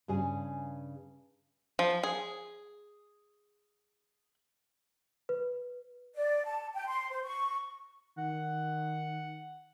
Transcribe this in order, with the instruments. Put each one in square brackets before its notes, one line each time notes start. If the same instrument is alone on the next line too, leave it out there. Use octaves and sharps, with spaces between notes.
[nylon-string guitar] G2 C#3 G#4 G#5
[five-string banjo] F3
G#4
[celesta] B4
[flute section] D5
A5
G5
C6
C5
C#6
[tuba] D#3 [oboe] F#5